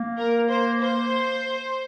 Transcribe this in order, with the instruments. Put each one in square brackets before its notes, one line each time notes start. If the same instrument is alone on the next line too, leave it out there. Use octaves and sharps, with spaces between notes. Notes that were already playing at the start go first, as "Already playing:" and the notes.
Already playing: [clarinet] A#3
[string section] A#4
C5
C5